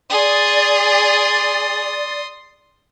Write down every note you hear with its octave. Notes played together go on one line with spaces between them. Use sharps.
G#4 D5 C6 D#6